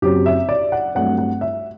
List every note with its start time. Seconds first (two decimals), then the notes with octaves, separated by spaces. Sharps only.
0.02 F#1 F#2 F#3 C4 G4
0.26 E5
0.49 D5
0.72 F#5
0.95 G2 F#3 A3 C4 F#5
1.18 F#5
1.41 E5